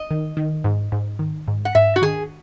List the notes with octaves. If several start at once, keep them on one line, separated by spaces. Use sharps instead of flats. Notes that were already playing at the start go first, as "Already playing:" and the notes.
Already playing: D#5
D#3
D#3
G#2
G#2
D#3
G#2
F#5
G#2 E5
F#4
D#3 G#4